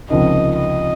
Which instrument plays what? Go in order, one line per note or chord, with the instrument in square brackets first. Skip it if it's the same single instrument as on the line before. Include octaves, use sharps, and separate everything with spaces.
[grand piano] C#2 C3 F3 A#3 D#4 [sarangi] D#5
[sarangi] D#5